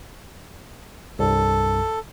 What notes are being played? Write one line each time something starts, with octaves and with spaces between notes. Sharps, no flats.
C2 G2 A4